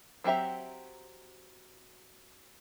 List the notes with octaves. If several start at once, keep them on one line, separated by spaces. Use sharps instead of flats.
F#3 C4 G4 E5 A#5